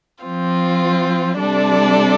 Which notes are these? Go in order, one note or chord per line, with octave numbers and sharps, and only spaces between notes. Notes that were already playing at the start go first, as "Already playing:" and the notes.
F3 C4 F4
C3 G3 D4 A4 D5